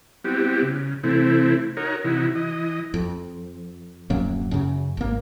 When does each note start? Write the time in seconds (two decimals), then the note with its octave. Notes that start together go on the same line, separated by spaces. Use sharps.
0.24 G3 B3 C4 E4 F#4 G4
0.62 C#3
1.03 C3 E3 A3 C4 E4
1.77 D#4 F#4 A#4 C#5
2.04 C3 E3 D#4 E4 F#4
2.35 E3 D#5
2.94 F2
4.10 D1 F#2 F#3 A#3
4.51 F#2 C#3
4.97 G#1 A#3